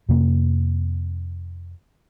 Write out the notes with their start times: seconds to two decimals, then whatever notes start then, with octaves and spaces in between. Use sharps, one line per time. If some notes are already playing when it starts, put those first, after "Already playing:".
0.09 F2 C3 A#3